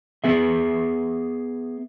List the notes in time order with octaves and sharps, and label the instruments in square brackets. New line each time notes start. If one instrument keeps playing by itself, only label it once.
[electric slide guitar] B3 G#4 E5